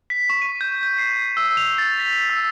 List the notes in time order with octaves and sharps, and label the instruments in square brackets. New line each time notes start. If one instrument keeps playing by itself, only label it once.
[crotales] B6
C#6
D#7
G6
G6
C7
E6
F7
A6
B6
E6